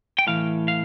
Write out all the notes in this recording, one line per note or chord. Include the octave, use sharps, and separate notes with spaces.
G5
A2 E3 F5
F5